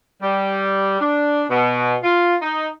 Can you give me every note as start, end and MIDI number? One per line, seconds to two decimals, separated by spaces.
0.22 0.96 55
1.01 1.44 62
1.50 1.96 47
2.03 2.36 65
2.42 2.69 63